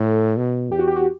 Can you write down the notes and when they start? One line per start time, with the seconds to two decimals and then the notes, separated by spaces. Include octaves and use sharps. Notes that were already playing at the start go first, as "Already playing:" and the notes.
Already playing: A2 A4
0.37 B2
0.71 E2 G4
0.79 F#4
0.88 G4
0.96 F#4